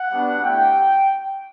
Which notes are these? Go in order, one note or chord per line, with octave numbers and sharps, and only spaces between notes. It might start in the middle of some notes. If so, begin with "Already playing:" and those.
Already playing: F#5
G3 B3 D4 F#4
A3 E4 G4 G5